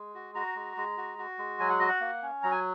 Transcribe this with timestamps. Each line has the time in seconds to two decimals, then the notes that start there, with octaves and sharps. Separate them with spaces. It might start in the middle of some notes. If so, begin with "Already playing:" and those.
Already playing: G#3
0.15 F#4
0.35 F#4 A#5
0.56 G#3
0.77 G#3
0.97 F#4
1.18 F#4
1.38 G#3
1.59 F#3 G#5
1.70 F#5
1.79 F#4 D#5
1.89 F#5
2.01 A#3
2.22 C#4
2.43 F#3 A#5
2.51 G#5